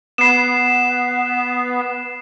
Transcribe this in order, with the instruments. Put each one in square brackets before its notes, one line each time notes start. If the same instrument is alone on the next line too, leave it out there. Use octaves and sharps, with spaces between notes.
[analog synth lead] B3 [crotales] C7 E7